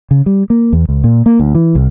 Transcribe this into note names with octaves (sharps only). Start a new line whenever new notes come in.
C#3
G3
A#3
E2
C#2
A#2
A#3
D2
E3
C2